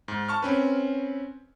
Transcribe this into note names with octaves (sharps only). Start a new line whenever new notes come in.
G#2
A5 C#6 F6
C4 C#4 B4